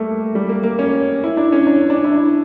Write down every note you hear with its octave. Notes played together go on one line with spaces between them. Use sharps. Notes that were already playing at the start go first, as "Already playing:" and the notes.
Already playing: G3 A3 A#3
G3
A#3
A#3
C#4
E4
D4
C#4
D4
D4
E4
D4